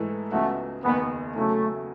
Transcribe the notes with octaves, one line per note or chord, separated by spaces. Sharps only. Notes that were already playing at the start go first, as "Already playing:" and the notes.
Already playing: G#2 E3 A3 E4 A4
C#2 C#3 E3 A3 B3 F#4
F#1 E2 D#3 B3
C#3 F#3 A3 C#4 E4